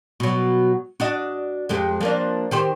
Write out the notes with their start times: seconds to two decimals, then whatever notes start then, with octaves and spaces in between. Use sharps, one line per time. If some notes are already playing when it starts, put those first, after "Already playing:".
0.20 B2 F#3
1.00 D4 F#4 D#5
1.69 F2 G#3 G4
2.01 F3 A#3 D4
2.51 D#3 G4 C5